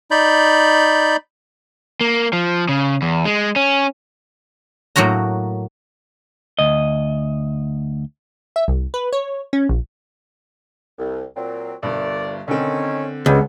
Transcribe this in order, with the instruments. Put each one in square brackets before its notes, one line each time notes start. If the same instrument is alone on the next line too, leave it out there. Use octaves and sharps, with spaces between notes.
[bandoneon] D#4 D5 B5 G6
[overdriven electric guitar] A#3
F3
C#3
E2
G#3
C#4
[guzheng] A2 F#3 A#3 F#4 A#5
[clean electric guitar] D2 D#5
[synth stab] E5
C2
B4
C#5
C#4
A#1
[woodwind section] C2
A#2 F#3 C4
[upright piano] G1 G2 [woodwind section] C2 D5
[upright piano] D3 C4 [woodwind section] D#3 C#4
[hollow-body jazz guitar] C#2 [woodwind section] C#3 G3 B3